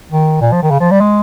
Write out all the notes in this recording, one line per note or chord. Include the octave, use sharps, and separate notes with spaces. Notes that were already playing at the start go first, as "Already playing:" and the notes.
D#3
A#2
F3
D#3
C#3
F3
G3
G#3